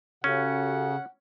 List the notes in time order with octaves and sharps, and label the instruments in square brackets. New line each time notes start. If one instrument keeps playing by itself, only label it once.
[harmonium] C#3 [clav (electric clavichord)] C#4 [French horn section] F#4 G4 A4 [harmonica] F#5